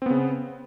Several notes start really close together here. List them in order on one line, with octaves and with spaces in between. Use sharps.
C4 B3 C#3